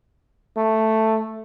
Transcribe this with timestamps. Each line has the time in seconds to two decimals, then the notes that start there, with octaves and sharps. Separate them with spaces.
0.57 A3